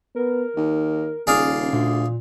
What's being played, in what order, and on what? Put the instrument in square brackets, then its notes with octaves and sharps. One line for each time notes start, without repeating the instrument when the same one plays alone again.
[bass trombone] B3 [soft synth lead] A#4
[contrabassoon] D#2 [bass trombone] D#3
[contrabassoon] D#1 [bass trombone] C#3 [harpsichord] G#4 D5 F5
[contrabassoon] D2 [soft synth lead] A#2